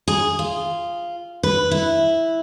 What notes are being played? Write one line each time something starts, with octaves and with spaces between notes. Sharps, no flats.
G#4
F4
B4
E4